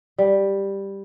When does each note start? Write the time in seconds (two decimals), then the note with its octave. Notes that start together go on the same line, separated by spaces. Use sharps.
0.18 G3